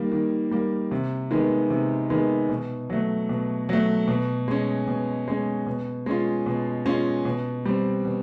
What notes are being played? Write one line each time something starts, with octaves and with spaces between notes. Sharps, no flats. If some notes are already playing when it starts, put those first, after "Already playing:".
Already playing: D#3 G3 A#3
D#3
G3 A#3
C3
D#3 G#3 B3
C3
D#3 G#3 B3
B2
F#3 A3
B2
F#3 A3
B2
G#3 C#4
B2
G#3 C#4
B2
G#3 C#4 F4
B2
G#3 C#4 F4
B2
G3 C4
B2